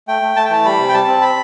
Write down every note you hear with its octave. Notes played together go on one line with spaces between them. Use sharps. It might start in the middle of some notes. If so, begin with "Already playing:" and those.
A3 G5
A3
A3 A5
G5
E3 A5
G3 B5
C3
G5
G3 A5
C4
B5